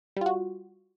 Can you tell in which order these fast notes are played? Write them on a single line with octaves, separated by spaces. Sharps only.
G3 F4 F#4